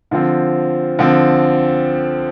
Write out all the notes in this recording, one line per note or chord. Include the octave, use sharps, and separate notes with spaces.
D3 F3 C4
D3 F3 C4